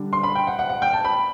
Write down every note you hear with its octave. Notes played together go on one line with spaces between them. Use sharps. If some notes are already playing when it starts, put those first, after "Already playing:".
Already playing: D3 G3 D4
C6
B5
G5
F#5
F#5
F#5
G5
A5
B5